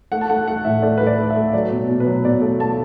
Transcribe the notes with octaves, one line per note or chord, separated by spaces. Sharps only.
A3 F#5
A5
A3 F#5
A3 F#5
A2 E5
A3 D5
A3 B4
D5
A3
E5
A3
F#3 D5
B2
B2
B4
F#3
B2 D5
A3
A3 A5